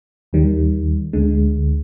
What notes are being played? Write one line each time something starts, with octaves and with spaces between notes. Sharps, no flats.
D#2 D#3 G3
D2 D3 G#3